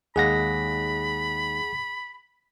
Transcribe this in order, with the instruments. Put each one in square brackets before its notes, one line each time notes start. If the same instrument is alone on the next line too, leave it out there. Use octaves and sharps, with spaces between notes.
[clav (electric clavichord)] D#2 G#3 F5 [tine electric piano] G#4 F#5 A#6 [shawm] B5